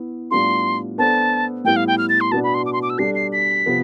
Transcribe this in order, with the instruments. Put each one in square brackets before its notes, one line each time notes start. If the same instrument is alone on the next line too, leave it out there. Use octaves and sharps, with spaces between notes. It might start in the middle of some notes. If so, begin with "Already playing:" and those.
Already playing: [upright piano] B3 E4 B4
[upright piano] A2 G3 B3 D4 F4 [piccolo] C6
[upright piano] B3 D4 A4 C5 [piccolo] A5
[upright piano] A2 G3 B3 E4 [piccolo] G5
[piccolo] F5
G5
F6
A6
C6
[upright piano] B2 B3 D4 [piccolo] A5
[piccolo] B5
C6
D6
C6
D6
E6
[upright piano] G3 D4 A4 [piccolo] C7
[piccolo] C7
B6
[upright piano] C3 F3 B3